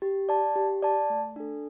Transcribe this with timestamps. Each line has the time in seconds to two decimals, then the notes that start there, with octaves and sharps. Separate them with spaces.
0.02 G4
0.29 D5 A5
0.56 G4
0.82 D5 A5
1.10 A3
1.36 D4 A4